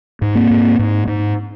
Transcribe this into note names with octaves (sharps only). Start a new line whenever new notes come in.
G#2
A#3 C4
G#2
G#2
G#2